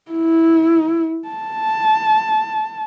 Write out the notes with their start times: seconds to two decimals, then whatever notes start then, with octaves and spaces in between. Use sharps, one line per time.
0.11 E4
1.28 A5